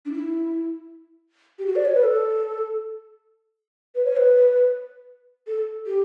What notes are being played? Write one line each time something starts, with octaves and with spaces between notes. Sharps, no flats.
D4
E4
G4
F#4
D5
C#5
B4
A4
B4
C#5
B4
A4
G4